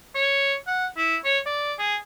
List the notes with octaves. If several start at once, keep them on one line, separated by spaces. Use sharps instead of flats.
C#5
F#5
E4
C#5
D5
G#4